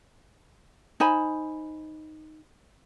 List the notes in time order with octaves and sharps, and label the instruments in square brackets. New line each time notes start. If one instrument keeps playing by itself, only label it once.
[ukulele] D#4 C5 G#5 B5